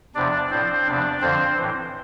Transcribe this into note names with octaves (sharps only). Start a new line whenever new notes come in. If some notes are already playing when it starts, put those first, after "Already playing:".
E2 C3 F3 D4 D5
A2 F3 C4 C5
E2 C3 F3 D4 D5
F2 D3 F3 C4 C5
A2 E3